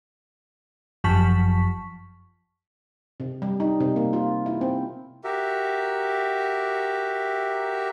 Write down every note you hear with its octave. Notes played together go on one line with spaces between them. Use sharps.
G1 F#2 F3 A5 C#6 B6
C3
G3
D#4
C3
A#3
F4
E4
C4
F#4 G4 A#4 E5